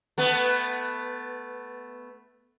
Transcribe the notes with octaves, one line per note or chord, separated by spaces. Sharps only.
A3 B3